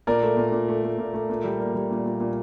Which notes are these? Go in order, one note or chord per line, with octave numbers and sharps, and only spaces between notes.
A#2 A#4 D5
A3
A#2
A#2
A3
A3
A#2
A3
A#2
G3
A#3
G3
A#2
A#2
A#2